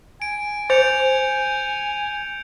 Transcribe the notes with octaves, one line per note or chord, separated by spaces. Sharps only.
G#5 D7
C5 G6 C#7 F7